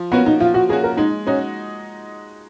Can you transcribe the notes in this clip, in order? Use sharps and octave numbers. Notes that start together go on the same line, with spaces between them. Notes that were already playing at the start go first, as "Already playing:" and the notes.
Already playing: F3
A#3 B3 C#4 F#4
D#4
F3 F4
F#4
A#3 C#4 F#4 G#4
A#4
G#3 D#4
C#4 D#4 F#4